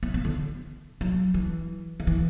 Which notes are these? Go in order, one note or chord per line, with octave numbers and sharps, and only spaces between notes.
B3
B3
D3
F#3
E3
D3
E3